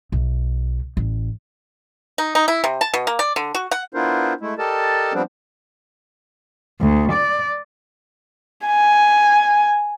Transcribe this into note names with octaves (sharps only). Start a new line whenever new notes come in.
B1
A1
D#4
D#4
E4
C3
A5
B2
A#3
D5
D3
F#4
F#5
B3 D4 E4 F4 A#4 C5
G#3 A3 E4
G4 A4 A#4 D5 D#5 A5
F3 G3 B3 C4 D4
D2
D5
G#5